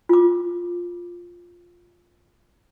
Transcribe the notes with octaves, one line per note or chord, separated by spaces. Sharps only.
F4 D6